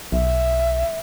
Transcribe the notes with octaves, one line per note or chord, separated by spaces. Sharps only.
B1 E5